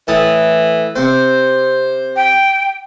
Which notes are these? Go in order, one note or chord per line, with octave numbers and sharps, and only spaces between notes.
A2 E3 A5 D#6
C3 C4 C5
G5